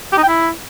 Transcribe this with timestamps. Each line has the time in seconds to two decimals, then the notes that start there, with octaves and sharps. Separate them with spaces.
0.12 G4
0.18 D#4
0.23 G5
0.28 E4